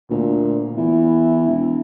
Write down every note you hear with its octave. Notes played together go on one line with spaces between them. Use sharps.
D2 A#2
E2 E4
E1